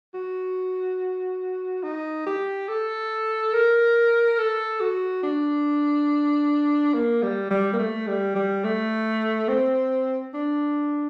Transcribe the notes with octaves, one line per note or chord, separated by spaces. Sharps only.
F#4
D#4
G4
A4
A#4
A4
F#4
D4
A#3
G3
G3
A#3
A3
G3
G3
A3
C4
D4